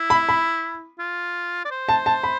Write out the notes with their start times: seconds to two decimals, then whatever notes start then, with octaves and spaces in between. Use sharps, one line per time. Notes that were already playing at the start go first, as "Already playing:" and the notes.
Already playing: E4
0.10 B5
0.29 B5
0.99 F4
1.65 D5
1.71 C5
1.89 A5
2.06 A5
2.23 B5